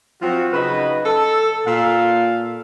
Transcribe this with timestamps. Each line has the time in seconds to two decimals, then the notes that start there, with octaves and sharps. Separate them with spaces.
0.22 F3 F#3 C4 F4 F#4
0.53 C#3 F#3 D#4 B4 D#5 B5
1.05 A4
1.67 A#2 A4 F5